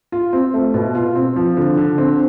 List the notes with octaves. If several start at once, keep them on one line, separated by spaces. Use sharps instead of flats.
F4
C4
A3
B2
F4
C4
F3
D3
D3
C4